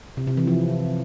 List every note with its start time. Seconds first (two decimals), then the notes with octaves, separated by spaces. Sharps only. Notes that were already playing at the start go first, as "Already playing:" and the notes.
0.17 C3
0.27 C3
0.37 E3
0.47 F3